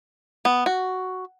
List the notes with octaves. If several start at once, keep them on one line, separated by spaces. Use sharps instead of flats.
B3
F#4